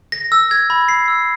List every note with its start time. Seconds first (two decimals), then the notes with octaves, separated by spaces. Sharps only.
0.12 A#6
0.32 E6
0.51 G#6
0.70 B5
0.89 C7
1.08 E6